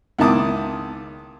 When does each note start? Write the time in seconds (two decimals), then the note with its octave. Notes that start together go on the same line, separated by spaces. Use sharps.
0.19 C#2 D#3 E4 A5 D6 D#6